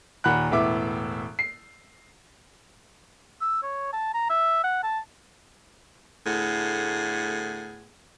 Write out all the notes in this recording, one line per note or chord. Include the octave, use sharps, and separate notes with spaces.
D#2 A#2 F#5 B5 F#6
E1 A2 B3 E5 D6
C7
E6
C#5
A5
A#5
E5
F#5
A5
D2 A2 A3 B3 G#4